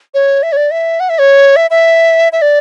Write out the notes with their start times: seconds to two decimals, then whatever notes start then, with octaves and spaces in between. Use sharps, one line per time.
0.14 C#5
0.43 E5
0.52 C#5
0.57 D5
0.71 E5
1.00 F#5
1.09 E5
1.20 C#5
1.56 E5
1.71 E5
2.33 E5
2.42 D5